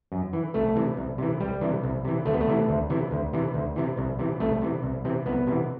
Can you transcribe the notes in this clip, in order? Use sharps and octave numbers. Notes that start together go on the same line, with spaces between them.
F#2
E3
C2 A3
C3 E3
C2
C3 E3
C2 G3
C3 E3
C2
C3 E3
D2 A3
B3
A3
C3 E3
D2
C3 E3
D2
C3 E3
D2
C3 E3
C2
C3 E3
C2 A3
C3 E3
C2
C3 E3 C4
C2 B3
C3 E3